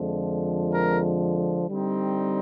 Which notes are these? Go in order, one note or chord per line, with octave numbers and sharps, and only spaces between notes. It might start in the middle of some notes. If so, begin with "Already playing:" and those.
Already playing: F2 D3 F3 G#3
A#4
D3 G3 C4 D#4